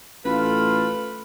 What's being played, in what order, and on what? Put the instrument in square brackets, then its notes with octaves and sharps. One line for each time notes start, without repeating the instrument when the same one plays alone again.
[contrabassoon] A1 [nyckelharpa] A3 B5 [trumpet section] F4 [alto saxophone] B4